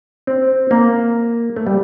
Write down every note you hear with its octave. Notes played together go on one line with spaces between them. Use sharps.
C4
A#3
A3
G3